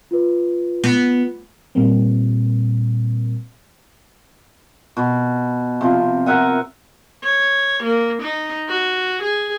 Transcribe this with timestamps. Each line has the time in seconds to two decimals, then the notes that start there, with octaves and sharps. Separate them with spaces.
0.11 F4 B4
0.84 B3
1.75 A#2 G3 A#3 C4
4.97 B2
5.81 C3 F3
6.26 A#4 E5 F#5 G#5
7.23 C#5
7.83 A#3
8.22 D#4
8.68 F#4
9.22 G#4